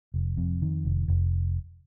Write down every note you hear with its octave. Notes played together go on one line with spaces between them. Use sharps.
F1
F2
D#3
F1
F1